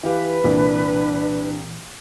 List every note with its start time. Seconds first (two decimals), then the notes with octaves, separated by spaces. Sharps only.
0.03 E3 G4 B4 F5
0.44 C2 A#2 E3 D4